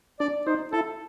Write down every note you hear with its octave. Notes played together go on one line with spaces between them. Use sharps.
D4 D5
D#4 C5
E4 A4